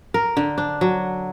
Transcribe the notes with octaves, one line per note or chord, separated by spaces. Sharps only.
A#4
D3
D4
F#3